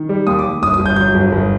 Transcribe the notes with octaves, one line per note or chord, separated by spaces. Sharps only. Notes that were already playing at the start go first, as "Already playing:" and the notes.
Already playing: D#3
G3
D#2 D#6
D6
D#2
G1 D#6
D#6
G1
G6
F#3 G6
G1
G1